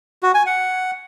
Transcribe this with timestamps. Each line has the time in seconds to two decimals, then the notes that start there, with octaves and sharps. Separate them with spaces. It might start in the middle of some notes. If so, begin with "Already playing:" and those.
0.23 F#4
0.34 G#5
0.46 F#5